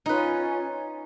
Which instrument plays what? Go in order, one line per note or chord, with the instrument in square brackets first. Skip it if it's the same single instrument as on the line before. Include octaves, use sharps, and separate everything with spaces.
[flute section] C#4 F4 [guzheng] D#4 B4